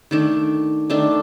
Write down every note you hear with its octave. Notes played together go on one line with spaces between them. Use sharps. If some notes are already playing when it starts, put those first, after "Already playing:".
D#3 A3 D4
D#3 A3 D4